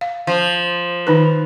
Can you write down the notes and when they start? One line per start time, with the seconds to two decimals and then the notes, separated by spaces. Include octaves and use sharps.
0.01 F5
0.27 F3
1.07 D#3 D#4 B4